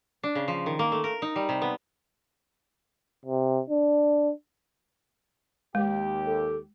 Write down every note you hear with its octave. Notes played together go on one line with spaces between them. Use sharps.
D4
C#3
F3
D#3
A#3
A3
A#4
D#4
G3
C3
B3
C3
D4
D#2 G#3 G4
A4